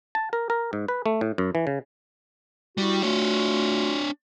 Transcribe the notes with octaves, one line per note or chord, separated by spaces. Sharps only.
A5
A#4
A#4
G#2
B4
A3
A2
F#2
E3
C#3
G3 E4 F#4
A3 D4 F4 F#4 C#5